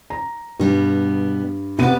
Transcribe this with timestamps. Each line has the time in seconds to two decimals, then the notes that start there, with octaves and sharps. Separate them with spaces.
0.10 A#5
0.60 G2 B2 G3 B3
1.79 C3 B3 B4 D5 D#7